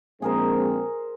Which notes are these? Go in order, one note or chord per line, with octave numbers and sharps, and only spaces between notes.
A#1 G#3 C4 G#4 A#4 C5